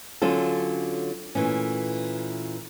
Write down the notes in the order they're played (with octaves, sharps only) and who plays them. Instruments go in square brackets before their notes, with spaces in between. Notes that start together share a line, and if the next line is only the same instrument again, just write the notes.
[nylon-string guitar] D3 F#3 C#4 F4 A4
A#2 E3 A3 C#4